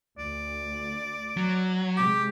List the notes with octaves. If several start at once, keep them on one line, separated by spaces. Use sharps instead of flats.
D2 D5
F#3
C3 G#3 G4 D6